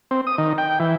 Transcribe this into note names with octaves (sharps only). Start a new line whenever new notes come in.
C4
D#6
D#3
G5
E3